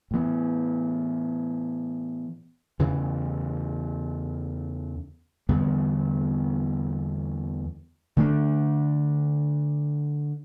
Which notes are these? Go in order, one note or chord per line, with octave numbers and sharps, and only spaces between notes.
A2 E3 B3
E2 C#3 E3
E2 D3 G3 B3
D3 A3 D4